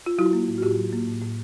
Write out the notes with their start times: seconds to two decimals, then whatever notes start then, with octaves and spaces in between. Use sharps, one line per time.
0.06 F4
0.18 F#3 E4 F#4
0.33 A#3
0.48 A2
0.58 F#4
0.62 A2 F4 G4
0.77 F#3
0.93 A#3
1.07 A2
1.22 A2